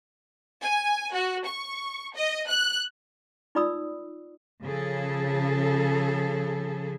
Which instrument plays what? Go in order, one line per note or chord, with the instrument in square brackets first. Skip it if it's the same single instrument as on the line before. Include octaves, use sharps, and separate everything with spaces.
[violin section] G#5
F#4
C#6
D#5
F#6
[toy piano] D#4 F4 D5 B5 D#6 E6
[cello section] C#3 F3 G#4 A4